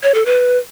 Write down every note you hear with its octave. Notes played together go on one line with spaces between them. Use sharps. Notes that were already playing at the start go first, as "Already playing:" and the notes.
C#5
A4
B4